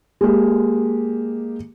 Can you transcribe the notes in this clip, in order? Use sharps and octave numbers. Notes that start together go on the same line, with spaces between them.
G#3 A#3 G4